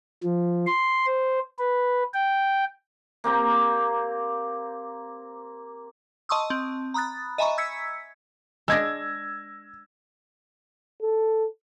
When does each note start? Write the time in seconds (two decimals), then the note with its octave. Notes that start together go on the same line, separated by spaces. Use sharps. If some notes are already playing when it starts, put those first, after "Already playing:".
0.23 F3
0.67 C6
1.06 C5
1.59 B4
2.14 G5
3.24 A#3 C4 G4 A#5
6.29 D#5 A5 C6 C#6 D#6 E6
6.50 C4
6.94 A#5 B5 D#6 F#6 A6
7.38 D#5 E5 G#5 A#5 B5 C#6
7.58 E6 G#6 B6 C#7
8.68 G#3 D4 E6 G#6 A#6
11.02 A4